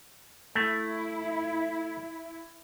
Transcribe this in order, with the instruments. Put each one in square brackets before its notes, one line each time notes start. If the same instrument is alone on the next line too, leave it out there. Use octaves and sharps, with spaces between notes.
[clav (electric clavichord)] A3 [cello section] E4